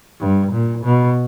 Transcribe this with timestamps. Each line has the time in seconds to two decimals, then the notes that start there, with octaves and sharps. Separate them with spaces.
0.20 G2
0.52 A#2
0.85 B2